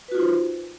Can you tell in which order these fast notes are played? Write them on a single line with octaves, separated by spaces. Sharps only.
B4 F#4 F4 D#4 C5